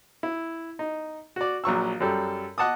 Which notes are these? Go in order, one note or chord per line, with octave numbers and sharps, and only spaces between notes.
E4
D#4
F#4 D5
A#1 F#3 C#6 E6
F#2 F#3 G3 A4
D#5 F#5 A5 D6 D#6